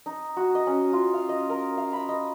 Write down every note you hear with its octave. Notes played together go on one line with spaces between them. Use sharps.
D#4
F#4
D#5
C#4
F4
F5
D#5
A#4
F5
B5
D#5